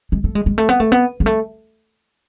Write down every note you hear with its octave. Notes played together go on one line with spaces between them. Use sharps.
G#3
A3
G#3
G#3
A3
B3
A3
B3
G#3
A3